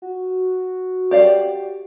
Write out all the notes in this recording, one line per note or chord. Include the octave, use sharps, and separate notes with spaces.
F#4
G4 D5 F5